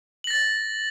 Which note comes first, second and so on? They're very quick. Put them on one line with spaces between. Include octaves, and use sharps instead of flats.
F#7 A#6 A6